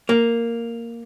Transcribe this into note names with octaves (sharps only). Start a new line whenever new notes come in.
A#3